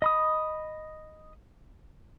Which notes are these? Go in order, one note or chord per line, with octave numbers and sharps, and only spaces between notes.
D#5 B5 D#6